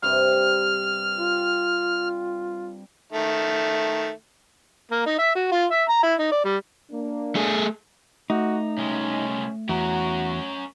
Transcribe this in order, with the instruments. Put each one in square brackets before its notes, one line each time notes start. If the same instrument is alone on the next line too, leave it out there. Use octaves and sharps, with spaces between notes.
[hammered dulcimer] G2 C3 [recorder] F6
[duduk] F4
[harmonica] D#3 A3
A#3
D#4
E5
F#4
F4
E5
A#5
E4
D#4
D5
G3
[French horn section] A#3 D4
[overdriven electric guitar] A3 G#4
[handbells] A3 [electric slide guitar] D#4 [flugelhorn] F#4
[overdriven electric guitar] C2 G#3 [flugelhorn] C#4
[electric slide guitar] E2 [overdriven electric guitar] C#4 A#4 [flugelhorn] F#4